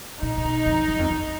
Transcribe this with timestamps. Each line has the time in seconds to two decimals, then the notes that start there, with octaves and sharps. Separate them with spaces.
0.22 A#2 D#4
0.37 A#2
0.45 B2
0.66 F2
0.88 F#2
0.99 F2
1.10 E2